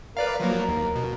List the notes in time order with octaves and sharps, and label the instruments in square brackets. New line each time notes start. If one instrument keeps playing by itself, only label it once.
[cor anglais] A#4 [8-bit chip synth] B4 D5 F5
[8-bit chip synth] F3 F#3 A#3
D#2
B2